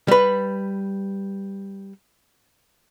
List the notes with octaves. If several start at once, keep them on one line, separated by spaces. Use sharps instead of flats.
G3 B4